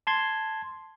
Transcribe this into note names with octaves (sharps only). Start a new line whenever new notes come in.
A5 C6 G#6